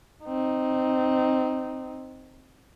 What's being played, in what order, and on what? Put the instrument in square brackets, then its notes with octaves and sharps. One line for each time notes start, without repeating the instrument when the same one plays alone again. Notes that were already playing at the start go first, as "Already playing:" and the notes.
[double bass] C4 D#4